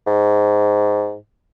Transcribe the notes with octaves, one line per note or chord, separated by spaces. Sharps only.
G#2